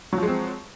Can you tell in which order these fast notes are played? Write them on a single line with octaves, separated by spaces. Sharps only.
F#3 F3 G#3 C4